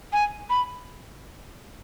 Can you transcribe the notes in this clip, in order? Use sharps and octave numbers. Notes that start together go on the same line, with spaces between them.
G#5
B5